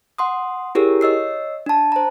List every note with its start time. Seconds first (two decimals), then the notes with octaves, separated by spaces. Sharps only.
0.18 F#5 C6 D#6
0.75 E4 G4 G#4 A#4 C#5
1.01 C#5 D#5 E6 C7
1.66 D4 A5
1.92 C5 A#5